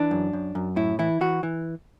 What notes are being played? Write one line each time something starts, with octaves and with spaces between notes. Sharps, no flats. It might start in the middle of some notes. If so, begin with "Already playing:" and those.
Already playing: E3 D4
F#2
F#2
F#2
A2 E4
E3 E4
E3 F#4
E3